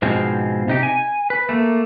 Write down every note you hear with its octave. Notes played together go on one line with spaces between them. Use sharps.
G#2 B2 F3 G#3 C4
C3 D#4 G4
G#5
B4
A3 A#3